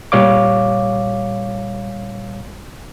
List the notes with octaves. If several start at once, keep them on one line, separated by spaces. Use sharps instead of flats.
A#2 G3 C#5 F5 D6